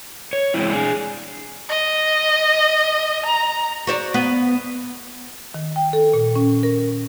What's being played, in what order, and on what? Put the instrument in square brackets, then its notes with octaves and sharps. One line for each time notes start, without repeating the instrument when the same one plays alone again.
[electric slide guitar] C#5
E3 G#3 A#3 C4 E4
D4 G#4
[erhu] D#5
A#5
[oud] F#4 C5 D5
B3
[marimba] D#3
G5
A4
A#2
C#4
A#4